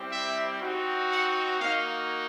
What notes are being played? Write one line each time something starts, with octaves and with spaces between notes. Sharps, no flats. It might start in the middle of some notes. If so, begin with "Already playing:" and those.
Already playing: G3 C4 E4 G4
E5
C4 D#4 F#4
F#5
A#3 D#4 F#4 F5